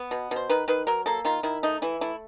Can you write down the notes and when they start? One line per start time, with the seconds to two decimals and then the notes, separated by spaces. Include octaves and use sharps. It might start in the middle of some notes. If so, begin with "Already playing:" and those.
Already playing: B3
0.11 B2
0.31 B2 C5
0.50 D#3 B4
0.68 D#3 B4
0.87 F#3 A#4
1.06 A#3 A4
1.25 D#3 F4
1.43 D#3 E4
1.63 A3 D#4
1.82 E3 E4
2.01 A3 E4